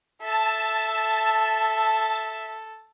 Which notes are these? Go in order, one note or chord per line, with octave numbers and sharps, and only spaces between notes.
A4 E5 A5